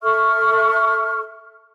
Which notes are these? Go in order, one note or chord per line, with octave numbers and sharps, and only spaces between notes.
A4 E5 C#6 F6